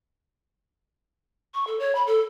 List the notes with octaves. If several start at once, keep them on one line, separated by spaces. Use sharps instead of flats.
C#6
A4
C#5
B5
A4